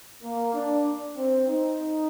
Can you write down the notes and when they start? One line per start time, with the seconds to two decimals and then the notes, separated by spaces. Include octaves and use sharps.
0.22 A#3
0.53 D4
1.16 C4
1.48 D#4